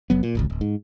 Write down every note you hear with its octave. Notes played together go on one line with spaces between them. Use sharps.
F1 F#3 B3
A#2
D1 G#1 C#2
D1
G#2